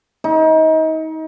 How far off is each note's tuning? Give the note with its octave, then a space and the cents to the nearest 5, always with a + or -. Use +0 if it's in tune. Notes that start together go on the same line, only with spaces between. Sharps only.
D#4 +30